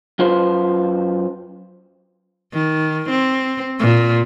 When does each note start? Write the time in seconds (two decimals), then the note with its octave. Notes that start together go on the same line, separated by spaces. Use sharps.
0.19 F#2 F4 B4 C5
2.53 D#3
3.10 C4
3.79 A#2